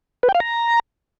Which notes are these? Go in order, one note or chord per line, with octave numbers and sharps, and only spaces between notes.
B4
G5
F5
A#5